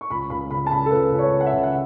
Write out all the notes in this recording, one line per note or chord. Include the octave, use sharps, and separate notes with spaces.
C#6
C#2 B5
C#2 B5
C#3 B5
A5
C#3 B5
A4
C#2 B4
C#2
C#5
C#3
F#5
E5
C#3
F#5